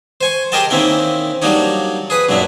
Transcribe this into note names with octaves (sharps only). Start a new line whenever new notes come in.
C5 G#5 C#6
G4 G#4 A#4 D#5 G5 A5
D#3 A#3 C4 C#4 E4 G5
F#3 G3 A#3 D4 D#4 C#5
G#4 B4 D#6
F#2 A#2 F#3 D4 E4